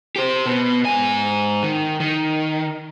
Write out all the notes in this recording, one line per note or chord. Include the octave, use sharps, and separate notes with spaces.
G4 C5
B2 B3
G#2 G#5
D#3
D#3